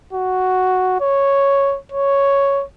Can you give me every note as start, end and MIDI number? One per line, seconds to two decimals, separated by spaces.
0.13 1.00 66
1.01 1.77 73
1.92 2.63 73